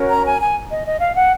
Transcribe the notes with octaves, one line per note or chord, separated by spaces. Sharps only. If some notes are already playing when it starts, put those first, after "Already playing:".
Already playing: C#4 F#4 A#4 C#5
A#5
G#5
G#5
D#5
D#5
F5
F#5